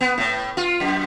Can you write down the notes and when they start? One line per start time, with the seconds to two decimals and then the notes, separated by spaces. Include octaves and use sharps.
0.01 B3
0.18 A2
0.57 F4
0.80 F#2